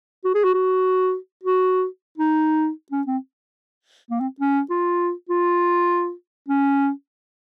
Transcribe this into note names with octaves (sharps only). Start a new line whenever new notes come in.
F#4
G#4
F#4
F#4
F#4
D#4
C#4
C4
A#3
C4
C#4
F4
F4
C#4